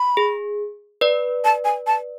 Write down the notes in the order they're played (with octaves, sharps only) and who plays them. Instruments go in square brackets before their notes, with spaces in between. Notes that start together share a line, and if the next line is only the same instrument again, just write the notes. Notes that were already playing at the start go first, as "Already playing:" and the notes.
Already playing: [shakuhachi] B5
[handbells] G#4
B4 D5
[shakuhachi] A5
G#5
A5